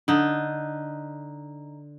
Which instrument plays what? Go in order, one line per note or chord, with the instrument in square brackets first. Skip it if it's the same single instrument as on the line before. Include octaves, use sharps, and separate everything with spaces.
[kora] D3 D#4